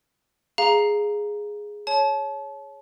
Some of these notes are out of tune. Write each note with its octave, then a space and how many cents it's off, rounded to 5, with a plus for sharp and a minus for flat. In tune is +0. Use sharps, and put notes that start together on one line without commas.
G#4 +0 F5 +0 A#5 +0
C#5 +0 A5 -30